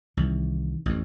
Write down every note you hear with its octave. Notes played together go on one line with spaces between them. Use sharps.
C2 D#3 E3
A1 F2